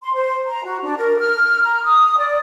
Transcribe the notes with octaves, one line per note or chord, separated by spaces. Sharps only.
C6
C5
A#5
F#4
D4
A#4
F6
A#5
D#6
D5